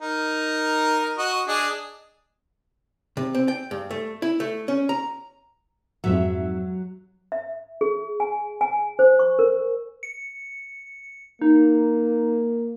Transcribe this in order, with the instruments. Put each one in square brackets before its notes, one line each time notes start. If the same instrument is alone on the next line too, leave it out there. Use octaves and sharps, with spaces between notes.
[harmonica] D#4 A#4
F#4 D#5
D4 G#4 D#5
[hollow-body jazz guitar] C3
C4
G5
G2
A3
E4
A3
C#4
A#5
[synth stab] F2 G#2 E5 [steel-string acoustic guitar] F#3
[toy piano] E5
G#4
G#5
G#5
C5
C#6
A#4
[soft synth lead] C#7
[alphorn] A#3 [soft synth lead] D#4